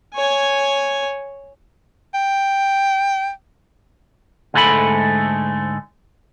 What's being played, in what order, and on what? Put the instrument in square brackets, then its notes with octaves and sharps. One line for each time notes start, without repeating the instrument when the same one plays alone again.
[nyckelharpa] C#5 G#5
[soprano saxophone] G5
[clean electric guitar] D2 G#2 G#3 A3 A4 B5